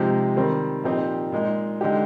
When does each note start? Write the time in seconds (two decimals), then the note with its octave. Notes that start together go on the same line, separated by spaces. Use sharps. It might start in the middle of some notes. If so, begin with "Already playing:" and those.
Already playing: C3 F3 G#3 D#4 G4
0.36 D#3 G3 C4
0.84 A#2 F3 C4 D#4 G4
1.32 A#2 G#3 D#4
1.81 D3 G#3 D#4 G4